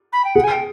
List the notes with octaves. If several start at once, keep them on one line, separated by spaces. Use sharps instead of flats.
B5
G5
G#4 F#5
G#5
G5